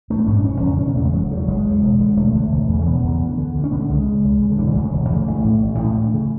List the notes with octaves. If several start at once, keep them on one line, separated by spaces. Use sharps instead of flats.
A1 A3
B3
G#2 C#4
D4
E1 C#4
E2 C#3
E1 C#4
B3
E2 C#3 A3
G#3
F#1 F#3
E2 C#3
F#3
F#1 G#3
E2 C#3
E1
D2 D3
E1 A3
D2 D3
E1
E2 C#3
A3
E1 B3
E2 C#3
D2
D3
D2
C#4
D3 B3
A3
C#2 G#3
C#3
C#2
C#3
D3
E1 E3
F#3
D2 C#3 G#3
F#3
E1
D2 C#3 A3
A1 A3
A2
A1
A2
D2
C#3